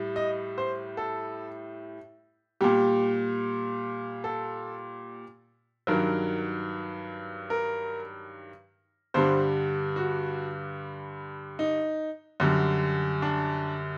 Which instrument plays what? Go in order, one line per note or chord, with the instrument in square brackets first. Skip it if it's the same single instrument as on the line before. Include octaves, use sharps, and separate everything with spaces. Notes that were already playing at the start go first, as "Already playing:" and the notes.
Already playing: [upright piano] A2 G3
D#5
C5
A4
A#2 G3 G4
A4
G2 D#3 F#3 A#4
A#4
G2 D3 G3 C5
F#4
D#4
F#2 D3 G3
D4